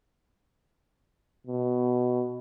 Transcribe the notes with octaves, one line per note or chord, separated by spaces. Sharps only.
B2